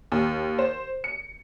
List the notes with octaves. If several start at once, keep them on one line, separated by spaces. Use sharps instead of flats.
D#2
C5
C#7